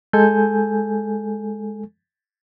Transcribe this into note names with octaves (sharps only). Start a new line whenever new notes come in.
G#3 A4 G#5 G6